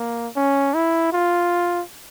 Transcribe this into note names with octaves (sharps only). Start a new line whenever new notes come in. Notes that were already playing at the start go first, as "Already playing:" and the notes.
Already playing: A#3
C#4
E4
F4